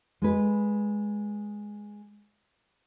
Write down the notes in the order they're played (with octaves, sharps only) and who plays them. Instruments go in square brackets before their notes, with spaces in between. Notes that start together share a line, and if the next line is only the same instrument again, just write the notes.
[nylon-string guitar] G#3 G#4 B4